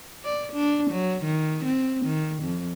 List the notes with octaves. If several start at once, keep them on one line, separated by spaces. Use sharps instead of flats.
D5
D4
F#3
D#3
C4
D#3
F2